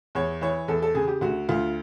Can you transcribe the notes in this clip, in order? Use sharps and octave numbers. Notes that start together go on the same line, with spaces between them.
E2 C#5
E3 C#5
E2 A4
A4
C#3 G#4
G4
D2 F#4
D2 F4